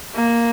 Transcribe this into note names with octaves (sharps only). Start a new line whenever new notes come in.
A#3